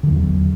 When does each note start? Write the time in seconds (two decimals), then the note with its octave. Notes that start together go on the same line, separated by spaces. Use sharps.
0.03 D3
0.07 F3
0.10 E2
0.14 F#3